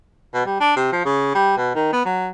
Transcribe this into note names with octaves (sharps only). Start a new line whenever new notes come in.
B2
G3
D4
C3
F3
C#3
G3
B2
D#3
B3
F#3